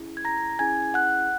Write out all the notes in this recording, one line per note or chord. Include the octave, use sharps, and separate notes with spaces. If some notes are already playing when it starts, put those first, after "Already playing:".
Already playing: C#4 E4 G#4
G#6
A#5 A#6
C#4 E4 G#4 G#5 G#6
F#5 F#6